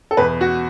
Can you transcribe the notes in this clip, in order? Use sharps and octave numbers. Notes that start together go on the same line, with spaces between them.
A4
E2 B2 B4
F#4